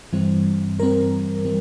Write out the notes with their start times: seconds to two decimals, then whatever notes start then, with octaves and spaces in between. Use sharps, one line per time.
0.13 G2 E3 G3 C4
0.79 G2 E3 G3 C4 A#4
1.45 E3 G3 C4